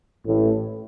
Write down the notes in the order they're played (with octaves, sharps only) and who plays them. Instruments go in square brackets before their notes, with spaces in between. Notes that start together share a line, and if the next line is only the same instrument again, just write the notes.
[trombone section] A1 A2